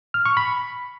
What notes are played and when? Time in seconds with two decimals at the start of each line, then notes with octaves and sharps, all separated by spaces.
0.14 F6
0.26 C#6
0.37 B5